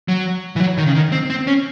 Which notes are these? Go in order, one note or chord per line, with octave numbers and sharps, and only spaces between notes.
F#3
E3
F#3
D#3
C#3
D#3
C4
C4
C#4